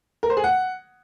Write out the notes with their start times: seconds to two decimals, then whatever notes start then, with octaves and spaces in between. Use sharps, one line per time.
0.23 A#4
0.30 C5
0.37 G#4
0.44 F#5